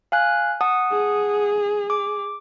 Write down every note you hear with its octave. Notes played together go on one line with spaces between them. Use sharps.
F5 G#5 F#6
F#5 A5 D#6
G#4
D6